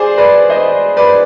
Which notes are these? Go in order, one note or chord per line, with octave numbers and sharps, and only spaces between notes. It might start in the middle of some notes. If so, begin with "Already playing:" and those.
Already playing: G#4 C5 D5
B4 D5
C5 D#5
B4 D5